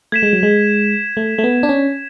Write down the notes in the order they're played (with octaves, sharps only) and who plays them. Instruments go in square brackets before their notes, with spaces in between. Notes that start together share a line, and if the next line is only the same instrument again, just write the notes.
[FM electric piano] A3 [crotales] G#6 B6 E7
[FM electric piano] G#3
F#3
G#3
A3
A3
B3
D4
C#4